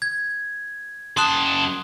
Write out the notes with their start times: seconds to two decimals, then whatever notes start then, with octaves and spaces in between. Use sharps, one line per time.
0.02 G#6
1.17 F#2 A5 C6 D#6 F#6